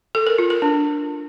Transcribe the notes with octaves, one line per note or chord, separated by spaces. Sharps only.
A4
A#4
F4
A#4
D4